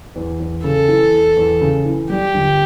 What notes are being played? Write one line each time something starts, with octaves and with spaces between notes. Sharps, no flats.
E2
E2
C#3 A4
E3
E2
E2
C#3
E3
G3 G4
G1